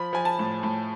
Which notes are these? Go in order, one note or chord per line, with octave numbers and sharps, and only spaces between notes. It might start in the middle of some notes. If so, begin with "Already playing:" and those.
Already playing: F3 B5
F3 G#5
A5
A2
A2